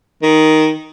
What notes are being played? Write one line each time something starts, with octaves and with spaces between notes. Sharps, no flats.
D#3